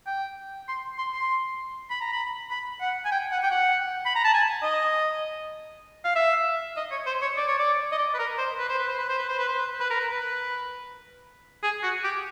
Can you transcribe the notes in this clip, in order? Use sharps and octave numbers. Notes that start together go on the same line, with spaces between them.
G5
C6
C6
C6
B5
A#5
B5
B5
F#5
G#5
G5
F#5
G5
F#5
B5
A#5
A5
G#5
D#5
F5
E5
D#5
C#5
C5
C#5
D5
C#5
D5
D#5
D5
B4
A#4
C5
B4
C5
B4
C5
B4
C5
B4
C5
B4
C5
B4
B4
A#4
B4
B4
G#4
F#4
G4